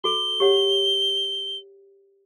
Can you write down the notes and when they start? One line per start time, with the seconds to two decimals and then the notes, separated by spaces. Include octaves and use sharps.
0.04 F#4 A4 G7
0.40 G4 C#5 F#5